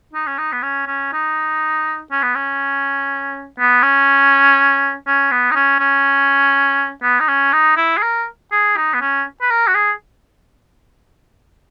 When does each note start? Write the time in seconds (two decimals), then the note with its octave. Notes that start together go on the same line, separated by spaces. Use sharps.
0.13 D#4
0.27 C#4
0.38 D#4
0.52 B3
0.62 C#4
0.87 C#4
1.13 D#4
2.11 C#4
2.23 B3
2.35 C#4
3.59 B3
3.83 C#4
5.07 C#4
5.31 B3
5.51 D#4
5.55 C#4
5.80 C#4
7.03 B3
7.20 D#4
7.28 C#4
7.53 D#4
7.77 E4
7.97 G#4
8.02 A#4
8.52 G#4
8.77 D#4
8.93 B3
9.01 C#4
9.41 B4
9.50 A#4
9.67 F#4
9.74 G#4